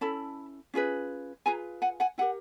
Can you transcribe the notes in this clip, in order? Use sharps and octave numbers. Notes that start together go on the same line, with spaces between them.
C#4 E4 A4 A5 B5
C#4 F4 G#4 B4
F4 G#4 B4 G#5 A#5
F#5 G#5
F#5 G#5
E4 G4 A#4 F#5 G#5